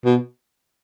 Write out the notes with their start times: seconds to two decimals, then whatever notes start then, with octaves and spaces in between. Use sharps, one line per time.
0.05 B2